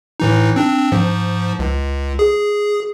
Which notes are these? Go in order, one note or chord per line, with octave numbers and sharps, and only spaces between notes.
A2 E3 D#4
C4 D4
G#2 F3
C#2
G#4